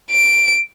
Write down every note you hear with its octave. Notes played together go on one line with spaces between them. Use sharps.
D7